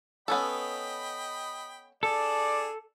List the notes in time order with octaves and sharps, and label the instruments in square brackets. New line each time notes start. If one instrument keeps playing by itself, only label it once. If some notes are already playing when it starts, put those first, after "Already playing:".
[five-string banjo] B3 C#4 A4 [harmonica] D#5 G5 B5
[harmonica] D4 G#4 [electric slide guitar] A4 [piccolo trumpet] D5